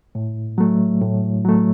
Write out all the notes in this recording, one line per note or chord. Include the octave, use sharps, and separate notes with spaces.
A2
F#3 A3
A2
F#3 A3